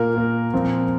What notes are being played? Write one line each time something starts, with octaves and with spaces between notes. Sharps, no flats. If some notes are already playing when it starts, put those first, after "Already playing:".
Already playing: A#2 A#3 A#4
A#2 A#3
A#2 F3 C4